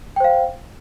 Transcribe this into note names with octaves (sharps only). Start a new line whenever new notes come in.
C5 F5 G5